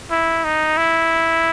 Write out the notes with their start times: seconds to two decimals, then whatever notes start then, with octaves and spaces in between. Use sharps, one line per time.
0.11 E4
0.44 D#4
0.77 E4